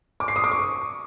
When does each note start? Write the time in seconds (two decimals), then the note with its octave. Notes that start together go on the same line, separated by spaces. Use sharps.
0.20 D6
0.28 C7
0.36 D#6
0.44 D6
0.52 C#6